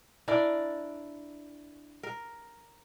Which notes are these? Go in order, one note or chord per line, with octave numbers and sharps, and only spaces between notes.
D4 E4 A#4 D5
A#4